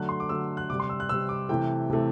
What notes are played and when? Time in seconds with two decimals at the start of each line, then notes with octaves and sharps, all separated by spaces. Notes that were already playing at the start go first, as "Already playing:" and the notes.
Already playing: D3 F#3 A3 F#6
0.09 C6
0.20 D6
0.29 D3 F#3 A3 E6
0.57 F#6
0.69 C3 D6
0.72 G3
0.80 C6
0.90 E6
1.00 F#6
1.09 C3 G3 E6
1.29 D6
1.49 C3 E3 A3 G5
1.89 C3 E3 A3